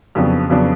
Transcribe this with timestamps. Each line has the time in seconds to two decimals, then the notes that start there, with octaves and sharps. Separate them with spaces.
0.15 F2 C#3 F#3 B3 D4
0.50 F2 C#3 F#3 B3 D4